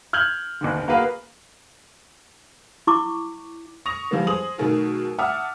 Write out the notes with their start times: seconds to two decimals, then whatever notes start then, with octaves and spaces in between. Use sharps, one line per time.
0.13 F6 G6 G#6 F#7
0.61 F#1 D#2 D3
0.88 A#3 F#4 G#4 B4 F5
2.87 E4 C#6 D6
3.86 C#6 D#6 A#6 F7
4.11 E3 F3 G3 G#3 B3
4.27 G#4 C5 D#6 F#7
4.58 B2 D#3 F#3 A3 G#4 A#4
5.18 E5 F#5 A5 D6 D#6 F6